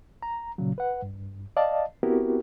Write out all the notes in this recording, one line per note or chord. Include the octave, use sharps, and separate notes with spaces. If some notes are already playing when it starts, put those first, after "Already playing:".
A#5
A#2 C#3 F#3
B4 F#5
G2
D5 D#5 F5 A5
B3 C4 E4 F#4 G4 A#4